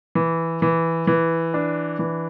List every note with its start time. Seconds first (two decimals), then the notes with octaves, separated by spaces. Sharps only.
0.15 E3
0.62 E3
1.07 E3
1.54 D4
1.99 E3